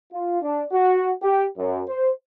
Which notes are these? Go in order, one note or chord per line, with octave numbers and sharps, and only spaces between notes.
F4
D4
F#4
G4
F#2
C5